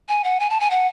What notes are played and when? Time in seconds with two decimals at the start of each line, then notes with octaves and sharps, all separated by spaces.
0.09 G#5
0.24 F#5
0.40 G#5
0.50 A5
0.60 G#5
0.71 F#5